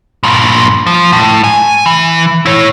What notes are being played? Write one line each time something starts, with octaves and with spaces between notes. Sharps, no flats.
G2 A#2
F3
A2
G#5
E3
E4 C#5